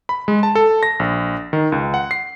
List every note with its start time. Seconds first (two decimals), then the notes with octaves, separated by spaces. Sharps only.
0.09 B5
0.28 G#3
0.43 A5
0.55 A4
0.83 A#6
1.00 A#1
1.53 D#3
1.72 C#2
1.94 F#5
2.11 C7